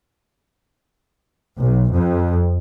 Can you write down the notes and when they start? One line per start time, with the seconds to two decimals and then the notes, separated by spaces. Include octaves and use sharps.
1.58 B1
1.94 F2